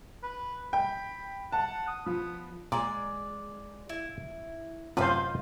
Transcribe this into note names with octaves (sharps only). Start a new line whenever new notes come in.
B4
G5 B5
F#5 A5
D#6
F3 B3
A#2 G#3 D5
E4
F#2 A2 C3 F4 B4 C5 D#5 F5